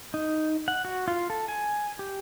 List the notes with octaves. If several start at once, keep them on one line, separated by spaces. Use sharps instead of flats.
D#4
F#5
F#4
F4
A4
G#5
G4